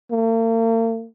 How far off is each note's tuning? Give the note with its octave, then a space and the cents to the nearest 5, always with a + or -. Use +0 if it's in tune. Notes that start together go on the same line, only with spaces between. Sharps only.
A#3 -45